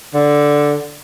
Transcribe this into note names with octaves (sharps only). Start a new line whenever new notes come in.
D3